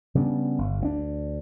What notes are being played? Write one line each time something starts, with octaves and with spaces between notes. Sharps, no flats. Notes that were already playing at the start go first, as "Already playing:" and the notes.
C#3 G3 B3 D4
G1
D2 B3 D4